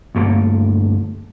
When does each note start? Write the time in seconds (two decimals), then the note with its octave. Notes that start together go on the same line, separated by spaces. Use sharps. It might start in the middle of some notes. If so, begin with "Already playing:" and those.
0.15 D2 G2 A3 A#3